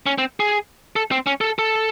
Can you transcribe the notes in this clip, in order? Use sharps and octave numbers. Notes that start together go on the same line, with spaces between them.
C#4
C4
G#4
A4
C4
C#4
A4
A4